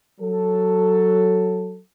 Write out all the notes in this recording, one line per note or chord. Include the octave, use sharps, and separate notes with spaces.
F#3 A4